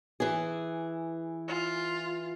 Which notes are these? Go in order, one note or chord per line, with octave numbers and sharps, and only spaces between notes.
E3 G#4
F4